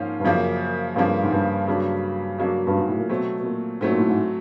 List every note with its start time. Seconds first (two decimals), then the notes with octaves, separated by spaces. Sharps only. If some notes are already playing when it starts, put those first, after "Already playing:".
Already playing: G#2 F3 A#3 C#4 F4
0.20 G2
0.25 F#2 C#3 F3 A#3
0.96 G2 C#3 F3 A#3
1.22 G#2
1.32 G2
1.67 C#3 F#3 A#3 D4
2.38 C#3 F#3 A#3 D4
2.67 G2
2.78 G#2
2.88 A2
2.98 A#2
3.09 B2 F#3 A3 C4
3.40 B2
3.45 A#2
3.81 G#2 F#3 A3 C4
3.90 A#2
3.99 A2
4.08 G#2